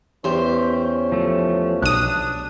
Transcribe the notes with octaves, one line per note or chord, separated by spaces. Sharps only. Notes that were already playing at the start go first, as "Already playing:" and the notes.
E2 C#4 G4 C5
F3 A3
B1 D4 D#6 F#6